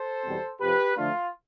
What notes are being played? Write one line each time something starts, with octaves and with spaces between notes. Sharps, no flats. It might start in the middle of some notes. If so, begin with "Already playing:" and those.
Already playing: A4 C5
E2 B2 G3 C4
F2 C3 F3 G4 B4
D3 F3 A3 D4 F4